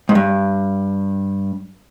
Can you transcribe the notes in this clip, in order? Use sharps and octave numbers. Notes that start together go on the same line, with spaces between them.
G#2
G2